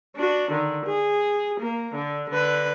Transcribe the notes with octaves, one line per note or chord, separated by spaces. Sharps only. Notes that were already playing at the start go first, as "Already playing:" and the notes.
D4 F#4
D3 D#3
G#4
A#3
D3
D3 B4